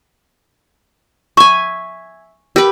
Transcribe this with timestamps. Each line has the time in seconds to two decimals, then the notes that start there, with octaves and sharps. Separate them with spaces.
1.37 E5 G#5 C#6
2.56 G4 A#4 B4